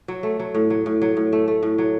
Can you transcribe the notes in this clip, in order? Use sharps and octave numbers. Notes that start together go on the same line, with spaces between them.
F#3
A3
F#3
A2
F#3
A2
F#3
A2
A3
A3
A2
F#3